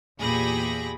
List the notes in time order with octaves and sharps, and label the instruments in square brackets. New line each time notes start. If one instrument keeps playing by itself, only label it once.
[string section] E2 A#2 G4 G#4 B5 A#6